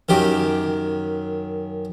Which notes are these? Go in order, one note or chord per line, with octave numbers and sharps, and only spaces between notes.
F#2 D#3 G4